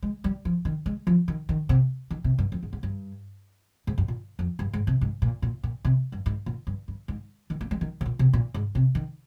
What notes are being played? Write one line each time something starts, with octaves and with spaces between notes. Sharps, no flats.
G#3
G3
F3
D#3
G#3
F3
D#3
D#3
C3
D#3
C3
G2
F2
G#2
G#2
G2
G#2
G2
A#2
F2
G2
G#2
C3
G#2
A#2
A#2
A#2
C3
G2
G#2
A#2
G2
G2
G#2
D#3
A#3
G#3
D#3
C3
A#2
C3
A#2
G#2
C3
D#3